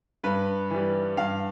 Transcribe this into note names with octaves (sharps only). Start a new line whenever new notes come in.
G2 B4
E3 G3
G2 F5